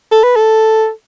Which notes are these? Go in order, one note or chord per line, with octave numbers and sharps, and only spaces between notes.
A4
B4
A4